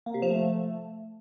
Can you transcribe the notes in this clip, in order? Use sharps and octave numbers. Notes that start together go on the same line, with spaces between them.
A#3
C3
F3
A3